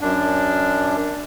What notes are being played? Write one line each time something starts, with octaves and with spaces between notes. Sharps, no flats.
F#2 D4